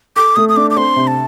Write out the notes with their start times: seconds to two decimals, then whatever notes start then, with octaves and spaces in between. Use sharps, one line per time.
0.16 A4 D6
0.36 A3 D#6
0.49 D#6
0.56 D4 D6
0.71 D6
0.76 C4 C6
0.96 C3
1.07 A5